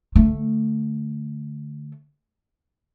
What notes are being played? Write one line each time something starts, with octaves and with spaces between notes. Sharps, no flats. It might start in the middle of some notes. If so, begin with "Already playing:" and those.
D3 A3